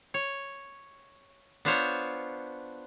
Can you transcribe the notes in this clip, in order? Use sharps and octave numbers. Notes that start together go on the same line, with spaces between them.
C#5
B3 D4 F4 C5 C#5